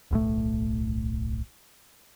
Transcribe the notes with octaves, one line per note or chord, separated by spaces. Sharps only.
D1 B1 A2 A3